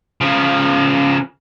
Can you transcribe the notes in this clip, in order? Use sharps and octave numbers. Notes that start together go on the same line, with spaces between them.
C#3 F3